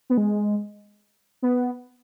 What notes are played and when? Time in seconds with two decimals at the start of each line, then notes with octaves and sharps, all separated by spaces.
0.10 B3
0.18 G#3
1.42 B3